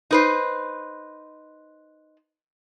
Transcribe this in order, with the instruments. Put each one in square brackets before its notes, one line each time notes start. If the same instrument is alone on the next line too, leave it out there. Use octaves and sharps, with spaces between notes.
[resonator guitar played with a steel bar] D#4 B4 C5